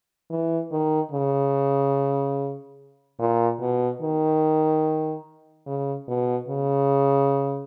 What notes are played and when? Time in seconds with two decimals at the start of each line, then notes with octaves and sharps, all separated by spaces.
0.30 E3
0.71 D#3
1.12 C#3
3.19 A#2
3.60 B2
4.01 D#3
5.66 C#3
6.08 B2
6.48 C#3